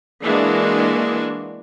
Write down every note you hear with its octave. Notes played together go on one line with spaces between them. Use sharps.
E3 G#3 A#3 D4 F#4